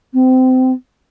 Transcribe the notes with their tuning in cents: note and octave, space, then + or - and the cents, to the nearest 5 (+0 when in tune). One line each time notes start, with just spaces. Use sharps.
C4 -25